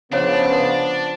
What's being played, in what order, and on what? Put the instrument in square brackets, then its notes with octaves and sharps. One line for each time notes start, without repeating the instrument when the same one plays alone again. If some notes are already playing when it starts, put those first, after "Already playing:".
[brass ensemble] C#3 B3 [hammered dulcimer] F3 F5 [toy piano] C#4 F4 C#5 [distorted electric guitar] D4